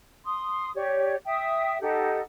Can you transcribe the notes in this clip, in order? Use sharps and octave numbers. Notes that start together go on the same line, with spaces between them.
C6 D#6
G4 C#5 D5
E5 G5 D#6
D#4 G4 A4 F#5